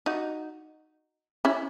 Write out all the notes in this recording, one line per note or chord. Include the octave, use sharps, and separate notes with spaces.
D#4 F#4
C#4 E4